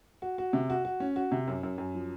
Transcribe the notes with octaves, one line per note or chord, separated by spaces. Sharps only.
F#4
F#4
C3
F#4
F#4
C#4
F#4
C3
F#2
F#2
F#2
F3